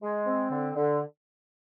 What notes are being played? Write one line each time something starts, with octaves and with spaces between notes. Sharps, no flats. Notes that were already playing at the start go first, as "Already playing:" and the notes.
G#3
C4
D3
D3